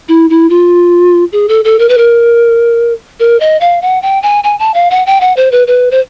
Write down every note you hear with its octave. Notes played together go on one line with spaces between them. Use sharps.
E4
E4
F4
G#4
A4
A4
A#4
B4
A#4
A#4
D#5
F5
F#5
G5
G#5
G#5
A5
F5
F#5
G5
F#5
C5
B4
B4
C5